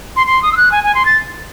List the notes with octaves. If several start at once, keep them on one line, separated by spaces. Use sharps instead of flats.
C6
C6
D#6
E6
F#6
G#5
G#5
C6
A6